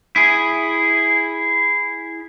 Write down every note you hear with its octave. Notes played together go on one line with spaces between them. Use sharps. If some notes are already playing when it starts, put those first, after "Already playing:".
E4 G#4